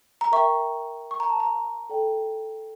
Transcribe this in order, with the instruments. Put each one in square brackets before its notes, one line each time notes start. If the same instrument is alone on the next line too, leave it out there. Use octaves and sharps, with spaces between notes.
[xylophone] A#5
A#4 E5 G5 C#6
C#6
A#5
A5
A#5
A4 D5 G5